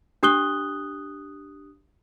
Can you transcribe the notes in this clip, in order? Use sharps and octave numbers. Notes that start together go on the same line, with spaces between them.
D4 G4 D#6 F#6 G7